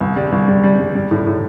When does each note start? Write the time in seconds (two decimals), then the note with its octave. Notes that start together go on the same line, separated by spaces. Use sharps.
0.01 C2
0.16 G3
0.32 C2
0.48 G3
0.64 G3
0.80 G3
0.95 G3
1.11 A2
1.27 A2